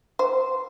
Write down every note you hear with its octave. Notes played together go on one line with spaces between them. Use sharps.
C5